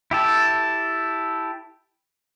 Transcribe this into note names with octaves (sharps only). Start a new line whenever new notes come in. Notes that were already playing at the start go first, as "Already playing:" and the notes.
E4 G4 A4